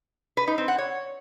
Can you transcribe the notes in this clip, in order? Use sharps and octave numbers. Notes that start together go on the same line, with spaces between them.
B4
D#4
C4
F#5
C#5